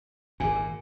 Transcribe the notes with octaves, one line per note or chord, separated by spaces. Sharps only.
G#1 A#2 G#4 G#5
A#4